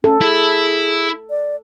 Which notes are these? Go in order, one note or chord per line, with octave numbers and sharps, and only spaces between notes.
C#4 A4
E4 G#4
D5